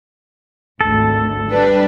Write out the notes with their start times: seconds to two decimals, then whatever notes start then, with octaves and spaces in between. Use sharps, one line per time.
0.81 G#1 D2 A4
1.49 G3 D4 B4